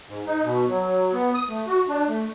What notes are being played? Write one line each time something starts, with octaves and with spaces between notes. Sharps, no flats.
G#2
D#4
B2
F#3
B3
D#6
A3
F#4
D4
A3